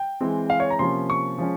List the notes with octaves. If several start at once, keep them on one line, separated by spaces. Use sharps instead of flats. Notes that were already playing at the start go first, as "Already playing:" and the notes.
Already playing: G5
E3 G#3 C4
F5
C#5
A#5
C3 F3 A#3 C#4 C6
C#6
F3 G#3 C#4